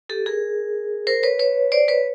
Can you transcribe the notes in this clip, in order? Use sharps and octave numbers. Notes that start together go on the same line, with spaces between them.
G4 A4
G#4 A#4
A#4 C5
B4 C#5
B4 C#5
C5 D5
B4 C#5